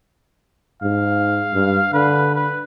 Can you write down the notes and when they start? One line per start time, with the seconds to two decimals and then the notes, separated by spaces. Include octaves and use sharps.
0.82 G#2 F5
1.54 G2
1.94 D3 B4
2.35 B4